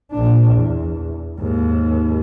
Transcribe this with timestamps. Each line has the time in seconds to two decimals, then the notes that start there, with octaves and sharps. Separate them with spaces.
0.11 A#1 D4
0.52 E2
1.38 D#2 G#2